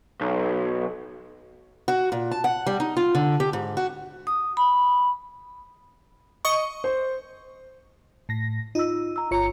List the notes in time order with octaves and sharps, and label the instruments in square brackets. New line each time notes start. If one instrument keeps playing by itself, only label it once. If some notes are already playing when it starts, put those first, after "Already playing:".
[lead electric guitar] B1
[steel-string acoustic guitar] F#4
A#2
A5
F#5
G3
D#4
F4
D3
G4
G#2
F#4
[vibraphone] D#6
B5
[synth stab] D#5 C#6
[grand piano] C5
[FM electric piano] A2 A#6
[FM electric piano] D#4 [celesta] F4 E6
[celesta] A#5 E6
[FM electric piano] G1 C#5 C#7 [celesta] F4 [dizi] A#5